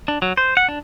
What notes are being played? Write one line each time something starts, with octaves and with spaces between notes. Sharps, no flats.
D4
F#3
C5
F#5
D4